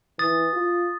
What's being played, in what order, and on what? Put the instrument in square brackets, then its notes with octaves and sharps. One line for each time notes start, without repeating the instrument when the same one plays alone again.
[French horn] E3 [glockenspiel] D#6 A6
[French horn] F4